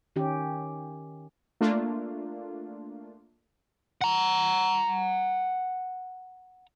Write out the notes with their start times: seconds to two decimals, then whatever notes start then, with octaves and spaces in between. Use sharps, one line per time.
0.16 D#3 C#4 G4
1.61 A3 A#3 D4 F4
4.01 F#5 A#5